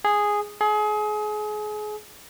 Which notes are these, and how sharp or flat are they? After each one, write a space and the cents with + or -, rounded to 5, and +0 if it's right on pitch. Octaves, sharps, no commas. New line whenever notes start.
G#4 -5
G#4 +30